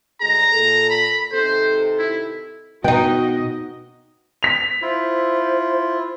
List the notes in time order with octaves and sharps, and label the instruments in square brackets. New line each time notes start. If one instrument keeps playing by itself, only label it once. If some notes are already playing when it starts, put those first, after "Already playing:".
[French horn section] D2 G#3 G#4 [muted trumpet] A#5
[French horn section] A#2 A4
[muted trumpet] B5
[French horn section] C3 D#3 A4 [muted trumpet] C5
[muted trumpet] E4
[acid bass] B2 [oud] B3 D#4 [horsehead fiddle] F#4 D#5 [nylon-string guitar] G5
[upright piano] B6 F7
[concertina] E4 F4 [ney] C5